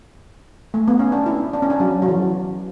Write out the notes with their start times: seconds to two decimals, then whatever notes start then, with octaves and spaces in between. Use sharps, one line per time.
0.74 A3
0.88 B3
0.99 C#4
1.12 D4
1.26 E4
1.53 D4
1.62 C#4
1.70 D4
1.80 F#3
2.02 F#3
2.08 E3